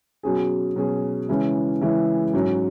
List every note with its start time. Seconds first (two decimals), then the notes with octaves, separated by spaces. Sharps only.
0.23 B2 F#3 C#4 G#4
0.76 B2 F#3 C#4 G#4
1.29 C#3 E3 G#3 C#4 E4
1.81 C#3 E3 G#3 C#4 E4
2.34 G#2 F#3 C#4